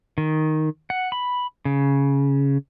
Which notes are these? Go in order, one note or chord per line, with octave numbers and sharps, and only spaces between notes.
D#3
F#5
B5
C#3